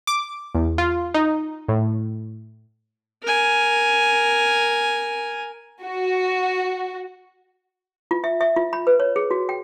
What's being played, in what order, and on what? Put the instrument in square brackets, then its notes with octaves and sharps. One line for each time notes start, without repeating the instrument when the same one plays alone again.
[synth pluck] D6
E2
F4
D#4
A2
[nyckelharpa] A#4 G#5
[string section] F#4
[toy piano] F4
E5
E5
F4
B5
B4
C#5
G#4
F#4
G5